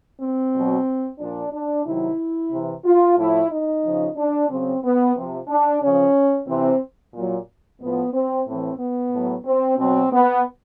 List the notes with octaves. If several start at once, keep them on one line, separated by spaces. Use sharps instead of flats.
C4
B2 F#3
A#2 F3 D4
D4
C3 D#3 F#3 E4
C3 E3
F4
A2 F3 E4
D#4
C#3 F3
D4
C#3 F#3 C4
B3
C3 F3
D4
C#3 F3 C#4
C3 E3 C4
A#2 F#3
A2 F3 B3
C4
A2 E3 C4
B3
A2 F#3
C4
B2 F#3 C4
B3